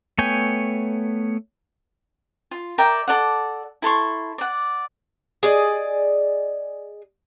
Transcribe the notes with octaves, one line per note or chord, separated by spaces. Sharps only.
A3 B3 C#5 G5 G#5
F4
A#4 D5 E5 G5
A4 D5 F#5
E4 A4 C6 C#6
D5 F#5
G#4 D5 D#5